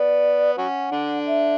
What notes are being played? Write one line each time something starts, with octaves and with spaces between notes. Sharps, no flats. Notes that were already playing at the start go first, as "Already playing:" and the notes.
Already playing: B3 D5
F#3 C#4 F#5
D3 D4
E5